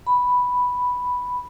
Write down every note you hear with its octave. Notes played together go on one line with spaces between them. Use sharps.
B5